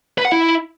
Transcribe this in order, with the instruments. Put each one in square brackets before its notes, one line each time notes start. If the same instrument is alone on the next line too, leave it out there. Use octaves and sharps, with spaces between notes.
[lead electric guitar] B4
F#5
E4